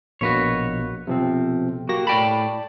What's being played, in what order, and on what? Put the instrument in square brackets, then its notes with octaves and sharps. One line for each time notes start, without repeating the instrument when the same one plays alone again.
[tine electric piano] A#1 B2 A#3 [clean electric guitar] F#4 B4 C#5
[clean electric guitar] B1 [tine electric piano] C3 F3 C4
[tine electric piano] A#3 G4 A#6 [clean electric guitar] F#4
[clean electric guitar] A2 G5 B5 [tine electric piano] D5 A5